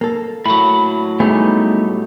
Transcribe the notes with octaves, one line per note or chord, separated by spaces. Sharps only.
A#3 A4
A2 F#3 B5
G3 A3 B3 D#4 G4 G#4